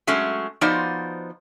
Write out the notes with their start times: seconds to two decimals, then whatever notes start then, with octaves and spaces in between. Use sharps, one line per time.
0.07 F#3 G#3 A3 C#4
0.61 F3 B3 D#4 F#4 C5 D5